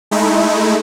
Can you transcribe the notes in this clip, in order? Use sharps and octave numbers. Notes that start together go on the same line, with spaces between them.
G#3 A3 D#4 E4